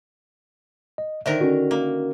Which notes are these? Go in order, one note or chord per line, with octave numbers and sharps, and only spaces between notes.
D#5
D3 D#3 A#4 C5 E5
C#4 F#4
A#3